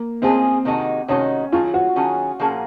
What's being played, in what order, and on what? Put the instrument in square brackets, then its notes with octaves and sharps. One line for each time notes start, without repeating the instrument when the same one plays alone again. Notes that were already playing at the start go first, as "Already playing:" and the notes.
Already playing: [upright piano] A#3
[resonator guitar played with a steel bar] G#3 C#4 F4 G#4 [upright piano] C4
[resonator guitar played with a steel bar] C3 D#3 G#3 D#4 F#4
[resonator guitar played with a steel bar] C3 D#3 G#3 D#4 F#4 [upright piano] C#4
[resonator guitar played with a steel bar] D#3 F#3 C#4 G#4 [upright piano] F4
[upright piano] F#4
[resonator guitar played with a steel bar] D#3 F#3 C#4 G#4
A#2 F3 A#3 C#4 G#4